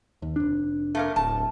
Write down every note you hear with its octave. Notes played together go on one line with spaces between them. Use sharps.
D#2
F1 D4
A3 A#3 A#4
D1 A5